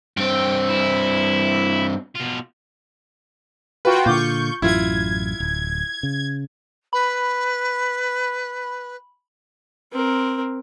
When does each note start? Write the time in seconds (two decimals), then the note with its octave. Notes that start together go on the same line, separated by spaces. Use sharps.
0.17 G2 C4 G5
0.69 E4
2.16 B2 F4
3.85 F4 F#4 B4 G5
4.06 A#2 D3 F4 C#6 D6 G6
4.62 A1 F#2 E4 F4 G#6
5.40 D1
6.03 C#3
6.93 B4 B5
9.92 C4 A#4